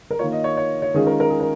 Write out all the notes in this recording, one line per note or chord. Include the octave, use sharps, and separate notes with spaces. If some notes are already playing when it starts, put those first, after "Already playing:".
A#4
D#3 A#3 F4 C#5
D#5
C#5
C#5
C#5
D#3 G#3 C#4 F4 G#4
A#4
A#4
G#4
A#4